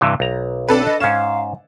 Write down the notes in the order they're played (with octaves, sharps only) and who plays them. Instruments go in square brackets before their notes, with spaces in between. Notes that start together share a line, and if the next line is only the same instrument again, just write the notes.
[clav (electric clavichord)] G2 C3 E3
B1 A#5
[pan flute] C4 [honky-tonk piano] D4 A4 B4
[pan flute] D#5
[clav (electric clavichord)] G#2 C#4 [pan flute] F5 [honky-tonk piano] E7